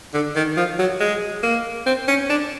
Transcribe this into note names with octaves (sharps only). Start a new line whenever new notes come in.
D3
D#3
F3
F#3
G#3
A#3
C4
C#4
D4